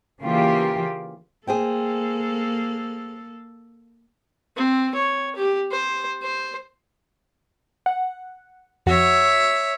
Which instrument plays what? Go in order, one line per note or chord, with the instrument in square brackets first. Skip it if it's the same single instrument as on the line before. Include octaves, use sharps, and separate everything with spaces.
[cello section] C#3 E3 A#3 F4 G4
[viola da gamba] A#3 A4 [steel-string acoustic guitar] G#4 C5 G5
[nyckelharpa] C4
C#5
G4
C5
C5
[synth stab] F#5
[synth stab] F2 F#4 [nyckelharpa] C#5 E5